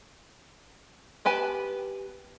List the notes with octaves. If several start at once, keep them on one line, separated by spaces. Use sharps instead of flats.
B3 G4 B4 G#5 A5